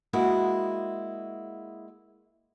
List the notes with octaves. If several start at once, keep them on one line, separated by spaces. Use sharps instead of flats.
G#3 A#3 E4 F#4 G#4